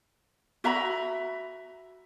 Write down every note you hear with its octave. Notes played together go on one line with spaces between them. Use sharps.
F#4 E5 A#5 B5